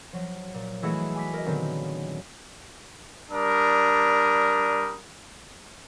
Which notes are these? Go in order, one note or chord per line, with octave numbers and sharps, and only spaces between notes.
F3 F#3
A#2
E3 G#3 A3 E4 F#4 G#4
G#5 D6 B6
A#4 D#5
A#2 D3 D#3 F#3 B3 C4
G3 D4 A#4 D#6